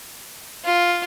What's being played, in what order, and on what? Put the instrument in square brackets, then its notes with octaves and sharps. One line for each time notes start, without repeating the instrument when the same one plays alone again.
[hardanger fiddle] F4